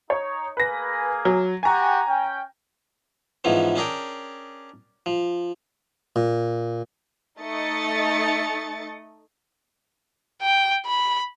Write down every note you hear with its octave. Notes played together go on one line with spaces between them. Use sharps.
D#4 C#5
A#3 G#4 B4 G#5 A#6
F#3
F#4 G4 G5 G#5 A#5
C#4 G5
G#2 E3 F3 B3 C#4
C#4 D4 G#4 A#4 G5
F3
A#2
A3 D#4 D#5 A6 C#7
G5
B5